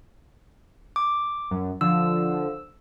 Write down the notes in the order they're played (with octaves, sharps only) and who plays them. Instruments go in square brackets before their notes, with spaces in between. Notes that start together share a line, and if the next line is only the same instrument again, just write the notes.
[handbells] D6
[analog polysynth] F#2
[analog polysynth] D3 F3 [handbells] E6